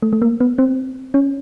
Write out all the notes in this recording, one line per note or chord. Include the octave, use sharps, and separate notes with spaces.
A3
A3
A#3
B3
C4
C#4